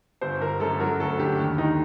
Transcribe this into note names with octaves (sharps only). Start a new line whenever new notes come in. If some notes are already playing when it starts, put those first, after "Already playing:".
G1 C5
G1 A#4
F#2 A4
F#3 A#4
D2 A4
D3 G4
D#2
D#2 D#4